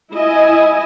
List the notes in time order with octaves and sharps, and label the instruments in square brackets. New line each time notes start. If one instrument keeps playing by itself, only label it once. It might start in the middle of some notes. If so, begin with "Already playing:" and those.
[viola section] E4 D#5 G#5